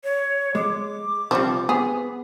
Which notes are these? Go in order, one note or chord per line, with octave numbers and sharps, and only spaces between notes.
C#5
G#3 D6
C2 F3 G3 C4
B3 G#4